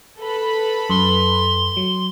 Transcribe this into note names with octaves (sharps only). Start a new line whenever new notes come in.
A4 B4 B5
F#2 C6
F#3